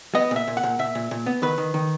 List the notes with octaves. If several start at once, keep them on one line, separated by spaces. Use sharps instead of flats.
B3 D#5
A#2 E5
A#2
F#5
A#2
A#2 E5
A#2
A#2
B3
D#3 B4
D#3
D#3